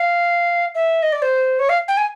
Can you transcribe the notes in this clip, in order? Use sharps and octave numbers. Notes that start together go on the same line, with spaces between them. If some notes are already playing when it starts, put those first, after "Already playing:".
Already playing: F5
E5
D#5
D5
C5
C#5
F5
G5
G#5